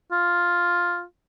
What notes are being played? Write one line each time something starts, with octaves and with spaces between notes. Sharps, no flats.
F4